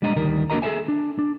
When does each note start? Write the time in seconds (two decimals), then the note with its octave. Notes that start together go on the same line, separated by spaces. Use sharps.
0.02 G3 G#3 D4 D#5 G5 A#5
0.16 D2 D#3 G3 A#4
0.50 A#3 D4 F#4 A#4 D#5 A#5
0.62 G#4 A4 B4 C5 E5 G#5
0.88 D4
1.19 D4